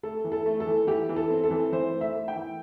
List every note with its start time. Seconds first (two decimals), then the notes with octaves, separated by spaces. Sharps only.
0.03 A3 A4
0.24 E3
0.32 A4
0.46 A3
0.60 A4
0.67 E3
0.87 E3 G4
1.09 E3
1.16 A4
1.30 C4
1.44 A4
1.51 E3
1.72 E3 C5
1.93 A3
2.01 E5
2.15 A3
2.28 G5
2.36 E3